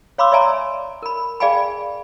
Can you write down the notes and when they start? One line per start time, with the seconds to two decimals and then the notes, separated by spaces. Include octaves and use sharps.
0.18 C#5 F5 B5 C6 D6 E6
0.32 C#5 D5 E5 F5 G#5 A#5
1.02 A#4 B5
1.40 G#4 D5 F5 G5 G#5 B5